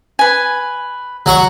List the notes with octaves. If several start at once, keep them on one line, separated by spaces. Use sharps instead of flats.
B4 G#5
F#3 F#5 C#6